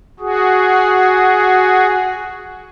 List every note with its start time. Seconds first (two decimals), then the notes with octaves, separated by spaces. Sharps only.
0.20 F#4 G#4